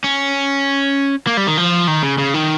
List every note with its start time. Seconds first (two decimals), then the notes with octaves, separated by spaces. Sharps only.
0.04 C#4
1.27 A#3
1.37 G3
1.47 D#3
1.57 F3
1.87 D#3
2.03 C#3
2.18 C#3
2.34 D#3